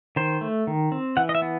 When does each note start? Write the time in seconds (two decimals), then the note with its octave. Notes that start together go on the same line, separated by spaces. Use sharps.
0.16 D#3 C5
0.41 A3
0.67 D#3
0.92 C4
1.17 E3 F#5
1.29 D#5
1.35 E5
1.42 B3